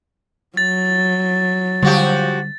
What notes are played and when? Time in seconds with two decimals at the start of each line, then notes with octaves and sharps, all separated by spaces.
0.57 F#3 A6
1.83 D3 F3 G3 F#4 G4